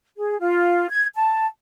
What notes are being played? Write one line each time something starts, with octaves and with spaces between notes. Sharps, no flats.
G#4
F4
G#6
A5